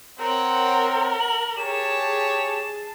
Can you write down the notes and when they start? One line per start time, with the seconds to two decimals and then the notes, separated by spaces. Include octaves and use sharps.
0.19 C4 A#4 C#5 F#5
1.20 F#7
1.57 G4 G#4 C#5 A5 E7